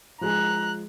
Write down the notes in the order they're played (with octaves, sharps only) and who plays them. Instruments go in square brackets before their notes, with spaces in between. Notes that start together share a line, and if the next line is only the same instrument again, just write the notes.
[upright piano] F3 G#3 G#4 [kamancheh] A#5 F#6